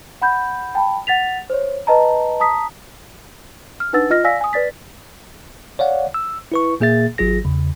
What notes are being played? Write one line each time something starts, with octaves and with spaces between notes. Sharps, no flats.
F#5 B5 G6
G5 A5 B5
F#5 A6 B6 F7
C5 C#5
B4 D#5 A5 A#5
A5 A#5 D#6 B6
F6
D4 D#4 B4 F#5 E6 A6
F4 D#5 F6 A#6
D5 F5 G#5 E6 A#6 B6
G#5 D#6
B4 D5 A6 B6
C#5 D5 F5 F#5
E6
E4 B4 C#6
A#2 A#3 G#4 E5 A6
G#1 F#3 F4 G#4 A#6
E2 C#3